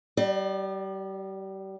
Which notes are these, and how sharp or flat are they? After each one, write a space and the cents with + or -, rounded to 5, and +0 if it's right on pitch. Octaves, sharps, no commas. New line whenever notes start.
G3 -30 D5 +35